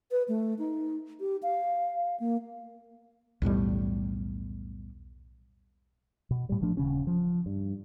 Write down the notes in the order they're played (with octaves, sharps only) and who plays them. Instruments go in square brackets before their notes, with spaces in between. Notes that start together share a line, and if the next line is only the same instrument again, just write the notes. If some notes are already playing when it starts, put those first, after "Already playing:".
[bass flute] B4
A3
D#4
G4
F5
A#3
[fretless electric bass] B1 E2 A2 G3
[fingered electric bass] B2
A2 G3
A1 F3 A3 D4
D#1 C#3 C#4
F3
G2